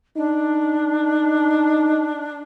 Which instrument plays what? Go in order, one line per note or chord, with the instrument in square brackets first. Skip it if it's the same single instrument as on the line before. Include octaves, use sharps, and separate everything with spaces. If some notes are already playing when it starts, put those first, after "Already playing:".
[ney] D4 [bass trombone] D#4